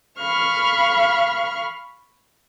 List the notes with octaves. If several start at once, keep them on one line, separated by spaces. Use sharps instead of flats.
F5 B5 C#6 F6